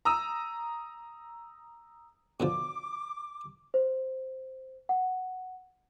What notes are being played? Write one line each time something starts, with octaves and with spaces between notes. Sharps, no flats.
A#5 D#6 E6
B2 D3 F3 D6
C5
F#5